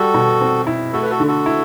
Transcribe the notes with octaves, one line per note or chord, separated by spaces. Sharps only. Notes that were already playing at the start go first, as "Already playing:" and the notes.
Already playing: G3 F#4 A4
B2
C4
E4
A3 F#4 A4
B4
F#4 A4
D3
F#4 A4
E4